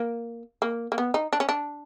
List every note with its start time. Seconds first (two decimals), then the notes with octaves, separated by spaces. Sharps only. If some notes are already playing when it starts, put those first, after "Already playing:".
Already playing: A#3
0.62 A#3
0.92 A#3
0.98 B3
1.14 D#4
1.33 D4
1.40 C#4
1.49 D4